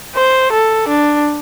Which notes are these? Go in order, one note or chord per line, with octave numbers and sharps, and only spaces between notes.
C5
A4
D4